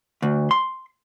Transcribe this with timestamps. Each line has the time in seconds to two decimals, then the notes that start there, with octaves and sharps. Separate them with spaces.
0.22 D2
0.51 C6